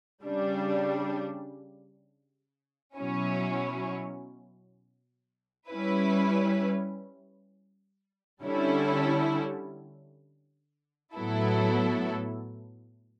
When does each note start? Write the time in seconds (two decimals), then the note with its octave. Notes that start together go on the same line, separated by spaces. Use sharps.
0.24 C#3 G3 D4
2.97 B2 F#3 C#4 E4
5.70 G3 C#4 E4 B4
8.43 D3 G3 C#4 E4 A4
11.15 A2 F#3 B3 E4 A4